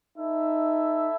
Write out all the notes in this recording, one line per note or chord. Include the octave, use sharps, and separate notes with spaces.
D#4 E4 A4 E5